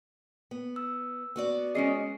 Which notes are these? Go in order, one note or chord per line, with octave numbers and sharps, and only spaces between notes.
B3
E6
B3 F#4 D5
G#3 C#4 G#4 D#5 C7